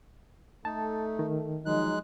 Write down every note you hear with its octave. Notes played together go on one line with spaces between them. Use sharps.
A3 D#4 A5
D#3
F3 F#3 G#3 D#4 F#6